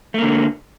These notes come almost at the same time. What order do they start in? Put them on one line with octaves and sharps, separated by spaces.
A3 A#3 D3